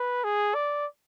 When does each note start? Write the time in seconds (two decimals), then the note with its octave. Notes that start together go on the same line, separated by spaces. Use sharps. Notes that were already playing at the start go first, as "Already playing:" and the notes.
Already playing: B4
0.24 G#4
0.54 D5